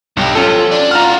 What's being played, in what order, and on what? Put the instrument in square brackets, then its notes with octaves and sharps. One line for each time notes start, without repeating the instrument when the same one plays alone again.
[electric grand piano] B1 [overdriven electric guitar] G2 G4
[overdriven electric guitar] F3 [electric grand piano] C#4 A4
[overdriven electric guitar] D4
[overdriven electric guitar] F4 F#4 [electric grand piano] A#5 F6